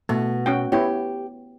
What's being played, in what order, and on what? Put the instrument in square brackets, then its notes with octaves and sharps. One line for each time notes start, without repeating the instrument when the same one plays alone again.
[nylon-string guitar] B2 [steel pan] A3
[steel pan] C#4 F#4 G5
[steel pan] B3 E4 C#5 [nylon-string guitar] G4